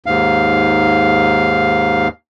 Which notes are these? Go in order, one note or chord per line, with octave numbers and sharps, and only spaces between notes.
D#2 G#2 F5